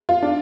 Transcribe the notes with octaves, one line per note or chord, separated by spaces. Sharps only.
F4
D4